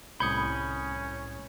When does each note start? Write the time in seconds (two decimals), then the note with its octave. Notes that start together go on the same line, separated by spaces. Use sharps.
0.20 C2 A2 C#4 B5 D#6 G6 G#6 C#7